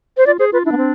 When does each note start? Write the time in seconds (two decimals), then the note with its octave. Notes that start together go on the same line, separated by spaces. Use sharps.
0.17 C5
0.26 F4 D5
0.39 G#4 C5
0.52 F4 B4
0.65 D4 E4
0.72 B3
0.78 C4